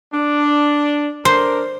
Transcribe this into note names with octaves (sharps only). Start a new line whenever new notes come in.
D4
D4 A#4 C5